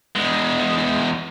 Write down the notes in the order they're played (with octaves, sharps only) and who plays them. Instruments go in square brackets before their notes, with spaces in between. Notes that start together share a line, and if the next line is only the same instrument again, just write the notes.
[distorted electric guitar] E2 G#3